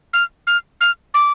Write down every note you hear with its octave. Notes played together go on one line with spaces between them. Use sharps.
F6
F6
F6
D6